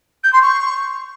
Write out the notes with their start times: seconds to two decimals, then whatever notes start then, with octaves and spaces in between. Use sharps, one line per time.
0.24 G6
0.33 C6
0.42 C#6